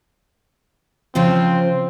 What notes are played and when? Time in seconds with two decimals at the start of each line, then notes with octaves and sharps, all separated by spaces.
1.15 C#3 F3 C4 F4